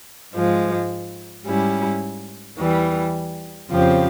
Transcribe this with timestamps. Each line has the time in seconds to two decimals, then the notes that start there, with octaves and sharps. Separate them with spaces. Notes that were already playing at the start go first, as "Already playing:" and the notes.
0.32 G#2 F3 G#3
1.45 G#2 G3 C#4 E4
2.57 E2 E3 G3
3.69 F2 C#3 F3 C4 G4